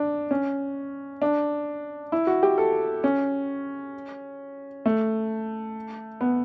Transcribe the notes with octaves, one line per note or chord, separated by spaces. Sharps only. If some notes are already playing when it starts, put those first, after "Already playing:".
Already playing: D4
C#4
D4
E4
F#4
G4
A4
C#4
A3
B3